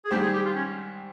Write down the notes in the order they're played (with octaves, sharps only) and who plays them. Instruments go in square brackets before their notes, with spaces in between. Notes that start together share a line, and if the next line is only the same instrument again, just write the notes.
[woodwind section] G#4
[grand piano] G#2 D#3 G3 C4 [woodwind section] G4
[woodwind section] G#4
G4
F4
C#4